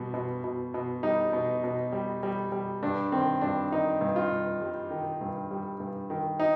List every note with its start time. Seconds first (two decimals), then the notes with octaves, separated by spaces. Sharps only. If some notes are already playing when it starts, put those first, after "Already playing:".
Already playing: B2 G3
0.14 B2
0.44 B2
0.74 B2
1.03 G3 D#4
1.33 B2
1.64 B2
1.92 G3
2.23 G3
2.52 G3
2.83 G2 D4
3.12 D#3 C4
3.41 G2 D4
3.72 D#3 D#4
4.01 G2
4.16 F4
4.32 G2
4.62 G3
4.91 D#3
5.21 G2
5.51 G3
5.80 G2
6.10 D#3
6.40 D#4